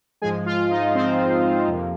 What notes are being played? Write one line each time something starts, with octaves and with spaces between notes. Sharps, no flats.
G#2 F3 G#3 G#4 G#5
F4 F5
D#4 D#5
G#2 F3 G#3 C4 C5
F2 C3 F3 A#3